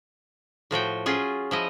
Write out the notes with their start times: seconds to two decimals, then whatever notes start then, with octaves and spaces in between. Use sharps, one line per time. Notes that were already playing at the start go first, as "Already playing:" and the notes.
0.71 A2 F3 F#4 G5
1.06 F#3 C#4 F4 G#4
1.51 F3 E4 D#5